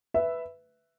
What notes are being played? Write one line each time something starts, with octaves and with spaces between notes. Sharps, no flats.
B4 E5